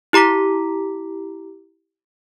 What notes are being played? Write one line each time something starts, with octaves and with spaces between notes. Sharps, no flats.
E4 G4 A#5 D6 B6